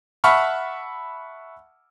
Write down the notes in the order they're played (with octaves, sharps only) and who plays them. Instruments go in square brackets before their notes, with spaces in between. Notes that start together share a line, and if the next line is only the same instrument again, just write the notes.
[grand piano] E5 F#5 A5 B5 C#6 F6